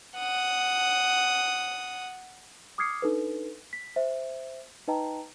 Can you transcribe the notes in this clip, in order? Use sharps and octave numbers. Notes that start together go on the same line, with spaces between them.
F#5 D#6
D6 D#6 F6 G#6 C7 C#7
D4 D#4 A4 B4
B6
C5 E5
D#4 B4 D#5 G5 A5 A#5